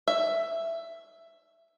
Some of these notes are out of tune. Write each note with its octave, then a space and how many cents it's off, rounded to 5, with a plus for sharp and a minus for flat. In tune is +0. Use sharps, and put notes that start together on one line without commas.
E5 +10